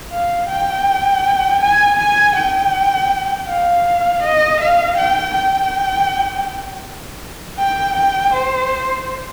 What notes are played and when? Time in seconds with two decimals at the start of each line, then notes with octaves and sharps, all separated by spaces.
0.12 F5
0.48 G5
1.61 G#5
1.98 G#5
2.36 G5
3.48 F5
4.23 D#5
4.60 F5
4.98 G5
5.35 G5
7.59 G5
7.96 G5
8.34 C5